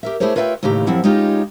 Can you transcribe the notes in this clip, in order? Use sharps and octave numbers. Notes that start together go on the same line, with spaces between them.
G4 A#4 E5
A3 E4 G4 G#4 C5 C#5
F4 B4 C#5 E5 F#5 G5
D#2 A2 C#3 E3 G4 A#5
F#2 F3 C4 E4 F#5
G#3 C#4 D#4 F4 G4